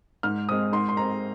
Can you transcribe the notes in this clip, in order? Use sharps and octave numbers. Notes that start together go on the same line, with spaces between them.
G#2 F6
G#3 C4 D#6
G#2 C6
C6
G#3 C4 A#5